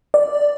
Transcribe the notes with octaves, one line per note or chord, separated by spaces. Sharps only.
D5